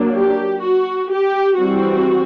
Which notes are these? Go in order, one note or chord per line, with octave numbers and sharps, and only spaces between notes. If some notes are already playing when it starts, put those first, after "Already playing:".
Already playing: F#3 A#3 D4
G4
F#4
G4
E3 G3 C4 F#4